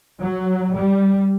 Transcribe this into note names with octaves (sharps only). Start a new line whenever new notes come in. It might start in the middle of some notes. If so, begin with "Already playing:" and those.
F#3
G3